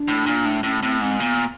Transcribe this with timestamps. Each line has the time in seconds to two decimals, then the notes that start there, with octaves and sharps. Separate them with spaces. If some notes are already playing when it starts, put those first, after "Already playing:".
Already playing: D4
0.08 A2
0.26 A#2
0.45 A2
0.63 A2 C#4
0.83 A2 C4
1.01 G#2 C4
1.20 A#2 B3